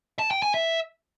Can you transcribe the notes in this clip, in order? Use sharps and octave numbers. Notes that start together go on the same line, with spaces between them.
A5
G5
G#5
E5